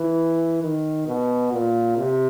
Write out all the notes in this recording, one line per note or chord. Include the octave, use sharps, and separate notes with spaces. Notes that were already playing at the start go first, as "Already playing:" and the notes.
Already playing: E3
D#3
B2
A#2
C3